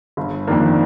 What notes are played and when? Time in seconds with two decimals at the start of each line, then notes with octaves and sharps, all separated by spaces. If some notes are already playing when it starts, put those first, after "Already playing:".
0.17 G1
0.47 F2 D#3 A#3 D4